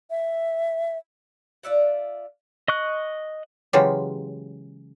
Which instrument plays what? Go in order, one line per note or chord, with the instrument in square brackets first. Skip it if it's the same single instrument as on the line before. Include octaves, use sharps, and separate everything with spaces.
[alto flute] E5
[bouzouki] F4 D5 E5 F#5
[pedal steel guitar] D#5 C#6 F#6
[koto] C#3 E3 F#3 G#3 F4 G4